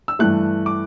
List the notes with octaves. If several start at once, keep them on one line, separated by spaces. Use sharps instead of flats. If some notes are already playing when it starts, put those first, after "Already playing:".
E6
G2 E3 A3 F#6
D6